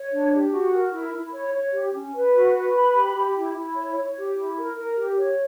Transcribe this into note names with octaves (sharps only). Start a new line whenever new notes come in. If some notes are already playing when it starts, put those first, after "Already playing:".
Already playing: C#5
D4
G4
F#4
A#4
E4
E4
C#5
C#5
G4
C#4
B4
F#4
B4
B5
G4
G4
E4
E4
C#5
C#5
G4
E4
A#4
A#4
G4
C#5